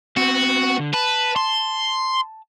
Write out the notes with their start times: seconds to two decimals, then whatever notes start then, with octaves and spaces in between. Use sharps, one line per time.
0.17 B3 C4 F#4
0.79 D3
0.94 B4 A5
1.36 C6